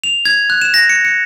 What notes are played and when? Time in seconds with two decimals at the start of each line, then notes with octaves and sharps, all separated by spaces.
0.04 F7
0.25 G#6
0.50 F#6
0.62 E7
0.74 A#6
0.89 C#7
1.05 C#7